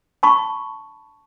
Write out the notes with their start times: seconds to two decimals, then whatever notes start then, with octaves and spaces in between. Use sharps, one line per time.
0.23 A5 B5 C#6